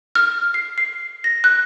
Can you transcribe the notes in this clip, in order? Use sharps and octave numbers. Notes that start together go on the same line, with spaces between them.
F6
C7
C7
A#6
F#6